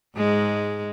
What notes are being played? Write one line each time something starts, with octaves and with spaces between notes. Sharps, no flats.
G#2 G#3